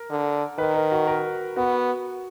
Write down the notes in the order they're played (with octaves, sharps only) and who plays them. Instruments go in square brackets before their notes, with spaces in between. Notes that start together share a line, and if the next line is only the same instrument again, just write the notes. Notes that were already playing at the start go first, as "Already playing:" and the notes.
Already playing: [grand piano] A#4
[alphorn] D3
[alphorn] D#3 [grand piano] B4
[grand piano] A#4
F#4
A#4
[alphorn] B3 [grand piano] F#4